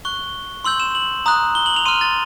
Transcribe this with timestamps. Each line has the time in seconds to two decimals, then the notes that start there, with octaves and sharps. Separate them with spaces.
0.05 C#6 F#6 G7
0.65 C6 E6 G6 F#7
0.80 E7
0.95 F#7
1.26 A#5 D#6 F#6
1.55 G7
1.66 F#7
1.76 F7
1.86 C6 F6 D#7
2.01 A6